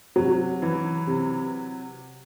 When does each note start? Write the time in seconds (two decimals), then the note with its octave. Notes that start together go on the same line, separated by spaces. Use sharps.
0.16 C3 F#3
0.62 E3
1.07 C3